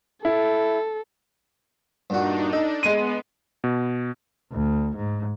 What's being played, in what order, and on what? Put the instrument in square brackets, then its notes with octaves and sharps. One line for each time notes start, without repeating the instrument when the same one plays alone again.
[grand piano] E4 [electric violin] A4
[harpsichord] G2 A#2 F#4 [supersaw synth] D4 D#4
[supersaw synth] D4 [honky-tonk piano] D#4 [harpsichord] A4
[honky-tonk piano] G#3 D#7 [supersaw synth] B3
[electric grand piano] B2
[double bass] D2
G#2